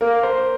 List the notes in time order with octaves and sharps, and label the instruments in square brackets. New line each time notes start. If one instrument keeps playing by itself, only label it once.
[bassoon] A#3 [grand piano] A#4
[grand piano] C5